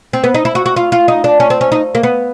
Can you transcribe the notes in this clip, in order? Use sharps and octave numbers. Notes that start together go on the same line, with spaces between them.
C4
B3
D#4
E4
F#4
F#4
F4
F4
D#4
D4
C#4
C4
C#4
D#4
A#3
B3